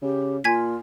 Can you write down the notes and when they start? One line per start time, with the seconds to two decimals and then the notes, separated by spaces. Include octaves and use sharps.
0.02 C#3 G4
0.44 A#2 F4 G#5 G#6 B6